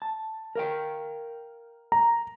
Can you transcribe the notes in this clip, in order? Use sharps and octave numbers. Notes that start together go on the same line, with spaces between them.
A5
A#4 F5 G5
A#5